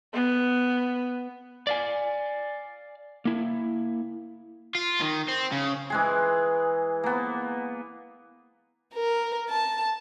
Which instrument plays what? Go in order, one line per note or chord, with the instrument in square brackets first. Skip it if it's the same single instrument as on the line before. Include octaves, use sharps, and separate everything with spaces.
[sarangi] B3
[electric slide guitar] D5 F5 G#5
A#3 E4
[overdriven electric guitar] F4
D#3
C4
C#3
[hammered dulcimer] E3 G#3 G#4
A#3 B3
[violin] A#4
A5